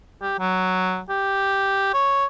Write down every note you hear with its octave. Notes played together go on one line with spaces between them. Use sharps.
G4
F#3
G4
C#5